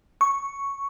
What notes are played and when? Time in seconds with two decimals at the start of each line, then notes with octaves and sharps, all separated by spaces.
0.21 C#6